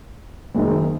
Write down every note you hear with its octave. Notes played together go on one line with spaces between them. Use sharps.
F#1 F#2 D#3